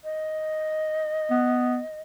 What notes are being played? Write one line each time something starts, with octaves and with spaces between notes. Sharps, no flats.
D#5
B3